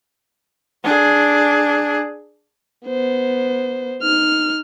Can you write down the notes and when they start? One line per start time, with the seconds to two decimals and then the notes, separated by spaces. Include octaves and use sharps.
0.84 D4 G#4
2.87 B3 C5
4.02 D#4 F6